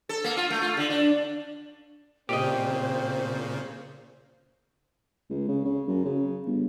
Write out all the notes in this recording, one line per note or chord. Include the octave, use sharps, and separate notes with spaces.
A4
A#3
F4
A3
F4
D3
D4
A#2 C#3 C4 G4 C5 D5 D#5
C#2
C#3
C#3
F#2
C#3
G1